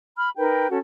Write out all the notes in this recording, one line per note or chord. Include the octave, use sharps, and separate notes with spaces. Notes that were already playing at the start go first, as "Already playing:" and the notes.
B5 F6
D#4 A#4 B4 G5
C#4 F#4 A4